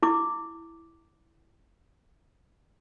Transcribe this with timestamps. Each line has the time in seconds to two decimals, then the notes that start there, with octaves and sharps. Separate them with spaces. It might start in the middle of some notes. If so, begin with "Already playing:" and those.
0.03 E4 D6